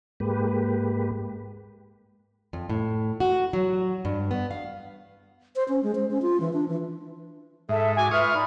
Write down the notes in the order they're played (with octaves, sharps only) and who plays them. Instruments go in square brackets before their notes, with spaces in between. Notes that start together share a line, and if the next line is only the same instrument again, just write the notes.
[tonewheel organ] G#2 G#3 A#3 G4 B4
[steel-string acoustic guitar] F2
A2
F#4
F#3
G2
B3
F5
[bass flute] C5
C#4
G#3
C5
C#4
F4
E3
D4
E3
[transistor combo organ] G#2 [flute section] A4 E5
[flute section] F#4 D6 [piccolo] G#5
[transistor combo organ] F4 C#6 D#6 [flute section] B4 E5 [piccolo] F6
[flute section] D#4 D5 B5